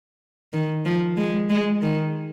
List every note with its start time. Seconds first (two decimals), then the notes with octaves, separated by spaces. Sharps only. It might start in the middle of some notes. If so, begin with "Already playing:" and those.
0.53 D#3
0.85 F3
1.17 G#3
1.50 G#3
1.82 D#3